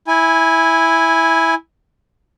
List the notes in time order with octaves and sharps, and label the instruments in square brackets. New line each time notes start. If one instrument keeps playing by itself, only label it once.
[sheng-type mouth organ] E4 G#5